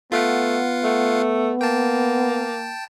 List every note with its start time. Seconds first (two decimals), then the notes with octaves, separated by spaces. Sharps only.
0.12 A3 B3 F4 F5 F#5
0.84 A3
1.61 A#3 G5 A5